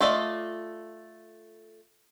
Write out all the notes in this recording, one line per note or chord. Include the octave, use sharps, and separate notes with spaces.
A3 F4 A4 D5 D#5